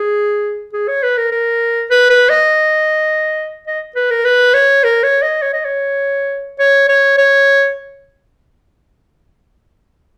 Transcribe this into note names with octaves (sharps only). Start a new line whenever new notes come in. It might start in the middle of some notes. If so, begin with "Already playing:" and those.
Already playing: G#4
G#4
C#5
B4
A#4
A#4
B4
B4
D#5
D#5
B4
A#4
B4
C#5
A#4
C#5
D#5
C#5
D#5
C#5
C#5
C#5
C#5